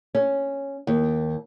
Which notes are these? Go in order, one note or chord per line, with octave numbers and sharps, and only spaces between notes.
C#4
D#2